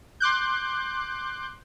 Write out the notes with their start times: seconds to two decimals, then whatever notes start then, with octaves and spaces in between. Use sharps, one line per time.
0.20 C6 D6 F#6 G6